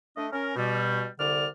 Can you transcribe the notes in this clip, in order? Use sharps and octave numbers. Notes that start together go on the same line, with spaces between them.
A3 D4 D#5
C#4 A#4
B2 G3
C2 D3 D5 F6